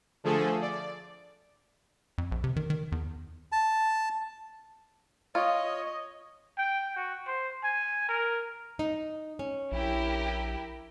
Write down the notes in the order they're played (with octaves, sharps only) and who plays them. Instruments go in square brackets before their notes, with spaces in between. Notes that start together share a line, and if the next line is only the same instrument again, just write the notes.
[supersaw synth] D3 F3 A3 G#4 A4
D5
[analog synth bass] F2
A#1
C3
D#3
D#3
E2
[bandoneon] A5
[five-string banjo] F4 [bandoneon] C#5 [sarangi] D#5
[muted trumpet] G5
F#4
C5
G#5
A#4
[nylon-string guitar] D#4
C#4
[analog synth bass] A#1 [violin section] E4 G4 A#4